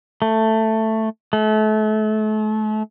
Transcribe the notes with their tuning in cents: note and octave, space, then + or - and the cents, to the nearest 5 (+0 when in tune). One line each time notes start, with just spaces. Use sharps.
A3 +10
A3 -35